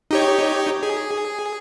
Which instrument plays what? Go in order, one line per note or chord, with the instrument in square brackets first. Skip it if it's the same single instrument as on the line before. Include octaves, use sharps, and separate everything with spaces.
[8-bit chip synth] D#4 G4 C#5
G#4